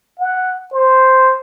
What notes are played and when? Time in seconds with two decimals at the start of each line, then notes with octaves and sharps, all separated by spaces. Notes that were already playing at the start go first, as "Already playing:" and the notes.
0.19 F#5
0.73 C5